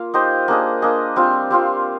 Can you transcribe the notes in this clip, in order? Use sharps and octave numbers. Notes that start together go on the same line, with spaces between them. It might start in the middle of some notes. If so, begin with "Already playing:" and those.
Already playing: A#3 F4 F5
D#4 G4 C5 D#5
A#3 D4 G#4 D#5
A#3 D4 G#4 D#5
G3 C4 F4
G3 C4 F4